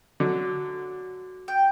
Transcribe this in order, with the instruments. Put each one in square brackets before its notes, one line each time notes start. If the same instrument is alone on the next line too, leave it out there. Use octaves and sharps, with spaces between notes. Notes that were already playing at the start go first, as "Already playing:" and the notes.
[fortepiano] D3 F#3
[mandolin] G5